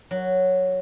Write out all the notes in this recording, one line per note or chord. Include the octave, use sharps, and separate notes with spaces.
F#3